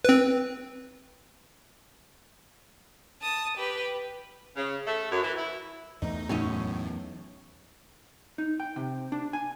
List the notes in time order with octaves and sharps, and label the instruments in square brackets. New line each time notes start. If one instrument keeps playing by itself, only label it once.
[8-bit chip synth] C4 B4
[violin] A5 D#6
G4 B4
[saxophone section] C#3
A3
F#2
E3
E4
[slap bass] E2 A3 [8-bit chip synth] D#4
[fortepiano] F#2 [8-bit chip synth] A2 [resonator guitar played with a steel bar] C#4 D#4 C#5
[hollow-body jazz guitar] D#4
G5
C3
D4
G#5